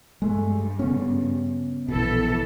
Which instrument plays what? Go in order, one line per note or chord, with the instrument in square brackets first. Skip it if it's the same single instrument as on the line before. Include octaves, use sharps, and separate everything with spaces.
[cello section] G2 [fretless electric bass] G#3 A3
[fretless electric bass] C#3 B3 C#4
[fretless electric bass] A#1 B2 [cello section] E3 A4